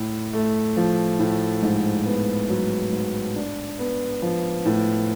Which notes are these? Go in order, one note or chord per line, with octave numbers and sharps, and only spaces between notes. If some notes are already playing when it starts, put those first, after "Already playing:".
Already playing: A2
A3
F3
A2
G#2
B3
F#3
G#2
D4
B3
F3
A2